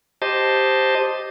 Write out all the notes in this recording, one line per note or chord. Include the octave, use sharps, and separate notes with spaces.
G4 C5 D#5 A5